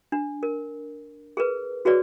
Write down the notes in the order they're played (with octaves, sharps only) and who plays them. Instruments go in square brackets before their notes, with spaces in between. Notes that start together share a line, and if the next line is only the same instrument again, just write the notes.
[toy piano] D4
A#4
G#4 A#4 B4
F#4 G#4 B4 C#5 D5